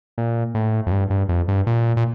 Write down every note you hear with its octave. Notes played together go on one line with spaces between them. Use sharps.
A#2
A2
F2
G2
G2
F2
G2
A#2
A#2